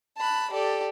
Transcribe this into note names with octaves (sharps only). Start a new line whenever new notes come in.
A5 B5 F#6
G4 A4 D5